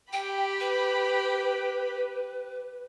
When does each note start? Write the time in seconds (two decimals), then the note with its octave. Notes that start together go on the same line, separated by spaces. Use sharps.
0.13 G4 G5 B5
0.60 B4